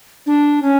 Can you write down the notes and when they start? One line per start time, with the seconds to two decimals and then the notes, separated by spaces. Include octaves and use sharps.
0.26 D4
0.62 C#4